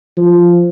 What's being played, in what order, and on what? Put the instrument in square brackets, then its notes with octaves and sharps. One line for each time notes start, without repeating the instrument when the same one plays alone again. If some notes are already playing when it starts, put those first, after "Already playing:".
[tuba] F3